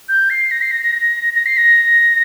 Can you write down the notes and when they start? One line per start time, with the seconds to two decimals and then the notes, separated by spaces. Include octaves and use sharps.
0.09 G6
0.30 C7
0.51 A#6
0.62 C7
0.71 A#6
0.82 A#6
1.35 A#6
1.46 C7
1.57 A#6